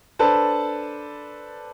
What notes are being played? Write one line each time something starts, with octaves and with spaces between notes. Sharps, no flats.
D4 A4 B4 C5 A5